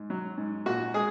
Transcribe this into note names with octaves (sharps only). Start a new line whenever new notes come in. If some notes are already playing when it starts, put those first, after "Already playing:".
Already playing: G#2
F#3
G#2
A#2 F#4
G#3 G#4